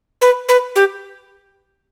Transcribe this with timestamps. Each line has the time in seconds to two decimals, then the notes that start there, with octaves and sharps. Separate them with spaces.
0.21 B4
0.49 B4
0.76 G4